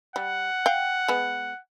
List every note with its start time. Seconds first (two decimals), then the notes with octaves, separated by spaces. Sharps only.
0.16 G3 F#5
0.66 F5 G5
1.08 G#3 B3